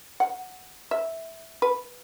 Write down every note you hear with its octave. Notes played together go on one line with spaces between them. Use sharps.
F#5
E5
B4